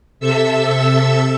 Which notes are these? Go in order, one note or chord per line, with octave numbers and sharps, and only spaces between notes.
C3 A4 E5 E6